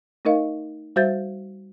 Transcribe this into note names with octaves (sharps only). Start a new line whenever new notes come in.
A3 D#4 A#4 D#5 F5
G3 F#4 C5 E5 G6 A6